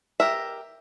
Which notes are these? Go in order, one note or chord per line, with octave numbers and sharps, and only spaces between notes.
G4 A#4 E5